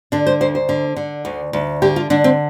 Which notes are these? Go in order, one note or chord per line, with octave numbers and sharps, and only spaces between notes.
D3 D4
C5
D2 C5
C5
D3
D3
D2
D2
D3 G4
F4
D3 D4
C4